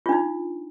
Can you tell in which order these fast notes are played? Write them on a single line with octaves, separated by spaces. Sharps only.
F4 D4 D#4